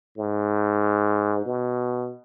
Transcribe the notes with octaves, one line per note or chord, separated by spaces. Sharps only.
G#2
B2